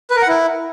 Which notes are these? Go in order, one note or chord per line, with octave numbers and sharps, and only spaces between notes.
B4
A#4
F#5
E4